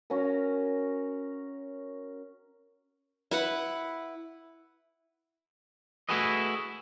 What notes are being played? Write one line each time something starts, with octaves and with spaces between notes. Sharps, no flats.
C#4 F#4 A#4
E4 B4 F#5
A3 E4 F#4 G#4 B4 D#5